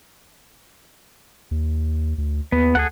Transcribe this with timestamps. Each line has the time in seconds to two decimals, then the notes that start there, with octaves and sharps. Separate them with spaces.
1.51 D#2
2.18 D2
2.52 D#2 B3
2.75 D2 G#4 A4 F#5